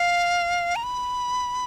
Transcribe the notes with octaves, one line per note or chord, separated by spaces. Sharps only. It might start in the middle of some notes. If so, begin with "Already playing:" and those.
Already playing: F5
A#5
B5